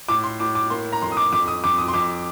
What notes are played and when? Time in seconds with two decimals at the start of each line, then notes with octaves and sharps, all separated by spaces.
0.09 A2 D6
0.24 C6
0.40 A2 D6
0.55 D6
0.70 A#3 C6
0.93 A#5
1.02 F2 C6
1.12 D#6
1.17 D6
1.32 F2 D6
1.47 D#6
1.64 F2 D6
1.78 D#6
1.88 C6
1.94 F2 D6